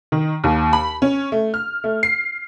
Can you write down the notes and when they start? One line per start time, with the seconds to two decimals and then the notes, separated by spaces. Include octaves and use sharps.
0.12 D#3
0.44 D#2
0.73 B5
1.02 C#4
1.32 A3
1.54 F6
1.84 A3
2.03 C7